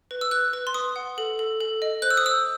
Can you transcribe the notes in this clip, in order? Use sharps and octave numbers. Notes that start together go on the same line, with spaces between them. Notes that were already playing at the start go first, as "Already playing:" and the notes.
B4
E6
B4 F#6
B4
C6
B4 D#6
F#5
A4
A4
A4
D#5
C5 F#6
E6
D#6
C5 E6